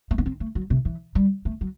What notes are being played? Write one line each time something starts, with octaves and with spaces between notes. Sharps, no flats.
A3
B3
C4
A3
F#3
C3
E3
G3
A3
F#3